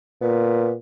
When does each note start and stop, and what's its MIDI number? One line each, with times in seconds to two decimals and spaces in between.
0.21 0.75 46
0.21 0.71 59